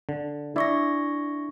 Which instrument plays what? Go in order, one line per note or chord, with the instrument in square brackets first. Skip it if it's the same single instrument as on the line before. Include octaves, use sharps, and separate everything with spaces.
[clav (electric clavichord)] D3
[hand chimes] D4 C#6 A#6 [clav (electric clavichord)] E4 D5 E5